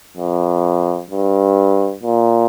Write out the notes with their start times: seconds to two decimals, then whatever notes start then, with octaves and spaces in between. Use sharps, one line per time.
0.17 F2
1.10 G2
2.03 A#2